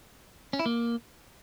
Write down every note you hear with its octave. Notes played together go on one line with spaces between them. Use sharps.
C#4
E4
A#3